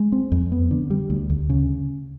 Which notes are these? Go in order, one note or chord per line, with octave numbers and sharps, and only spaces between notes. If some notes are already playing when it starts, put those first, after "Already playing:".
Already playing: G#3
C4
F2
B3
D3
G3
D2
D2
C#3